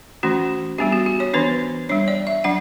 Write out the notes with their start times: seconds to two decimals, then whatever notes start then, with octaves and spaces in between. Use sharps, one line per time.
0.23 E3 A3 C#4 F#4
0.78 G3 B3 D4 G4
0.92 F#4
1.06 G4
1.20 C#5
1.34 E3 B3 D4 B4
1.89 G3 D4 C#5
2.08 D5
2.27 E5
2.44 F#3 D4 F#5